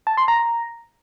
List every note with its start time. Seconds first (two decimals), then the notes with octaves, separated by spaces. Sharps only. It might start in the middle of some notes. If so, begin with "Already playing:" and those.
0.07 A5
0.17 C6
0.28 A#5